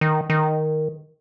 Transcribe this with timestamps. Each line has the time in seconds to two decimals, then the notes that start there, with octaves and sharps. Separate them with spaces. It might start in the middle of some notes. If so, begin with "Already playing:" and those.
0.01 D#3
0.30 D#3